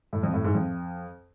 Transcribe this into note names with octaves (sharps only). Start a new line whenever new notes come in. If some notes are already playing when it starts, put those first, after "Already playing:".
A2
F2
A2
G#2
F2